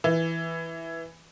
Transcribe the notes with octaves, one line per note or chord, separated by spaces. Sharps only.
E3